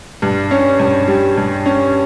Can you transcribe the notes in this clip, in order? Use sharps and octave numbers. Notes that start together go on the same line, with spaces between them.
G2
C#4
G2
G3
G2
C#4